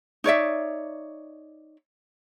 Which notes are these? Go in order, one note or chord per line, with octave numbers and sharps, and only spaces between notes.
D#4 C#5 D5 E5